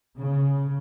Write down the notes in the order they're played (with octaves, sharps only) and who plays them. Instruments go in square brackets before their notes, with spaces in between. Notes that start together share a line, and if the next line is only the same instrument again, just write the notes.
[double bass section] C#3